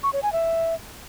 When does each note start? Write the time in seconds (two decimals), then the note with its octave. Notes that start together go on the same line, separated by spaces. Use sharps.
0.03 C#6
0.13 C#5
0.23 G#5
0.33 E5